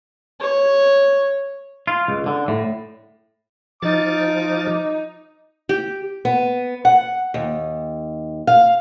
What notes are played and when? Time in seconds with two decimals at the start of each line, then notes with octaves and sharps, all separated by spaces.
0.40 C#5
1.87 F4
2.08 C#2
2.26 D3
2.48 A2
3.83 F3 D#4 D6 A6
5.69 G4
6.25 B3
6.85 F#5
7.34 D#2
8.47 F5